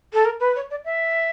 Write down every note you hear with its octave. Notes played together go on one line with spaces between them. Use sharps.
A4
A#4
B4
C#5
D5
E5